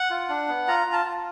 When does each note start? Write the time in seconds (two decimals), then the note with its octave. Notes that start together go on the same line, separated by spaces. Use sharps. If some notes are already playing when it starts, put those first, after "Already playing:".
Already playing: F#5
0.10 F4
0.29 D4
0.48 B3
0.68 F4 A#5
0.86 F4
0.92 A5
1.05 F4